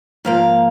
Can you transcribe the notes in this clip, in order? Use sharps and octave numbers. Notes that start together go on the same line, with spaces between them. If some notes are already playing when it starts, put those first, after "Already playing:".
G#2 F3 A#3 F5